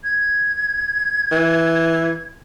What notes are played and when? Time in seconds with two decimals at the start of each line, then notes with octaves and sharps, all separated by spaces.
0.03 G#6
1.32 E3